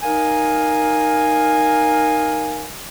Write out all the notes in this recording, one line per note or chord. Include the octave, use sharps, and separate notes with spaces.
D#4 A#4 F5 G#5